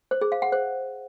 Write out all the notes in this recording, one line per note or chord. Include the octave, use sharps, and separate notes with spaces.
C5
G#4
F5
F#5
C5